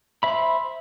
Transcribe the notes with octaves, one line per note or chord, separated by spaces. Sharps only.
C5 E5 B5